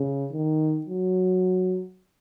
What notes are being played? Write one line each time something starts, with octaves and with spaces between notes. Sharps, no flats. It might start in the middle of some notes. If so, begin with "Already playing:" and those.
Already playing: C#3
D#3
F#3